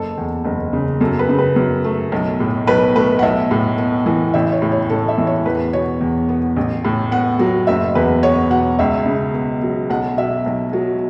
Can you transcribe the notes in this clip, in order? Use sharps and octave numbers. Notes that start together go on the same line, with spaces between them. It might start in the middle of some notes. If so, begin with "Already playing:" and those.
Already playing: F#1 A4
E2
F#1
C#3
F#2 A4
B4
C#3
B4
F#2
A3
B1
A2
B1 B4
A3 B4
F#5
B1 E5
A2
B3
E3
A1 E5
C#5
A2
C#5
A1 A4
E5
E3
C#5
E2 B4
B2 C#5
E2
B3
A1
A2
B3 F#5
F#3
F#1 E5
E2 B4
B3 C#5
B2 F#5
C#2 E5
C#3
B3
F#3
B1 F#5
B2 E5
B1
F#3